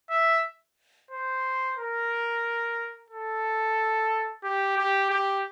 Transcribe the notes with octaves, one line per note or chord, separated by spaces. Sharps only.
E5
C5
A#4
A4
G4
G4
G4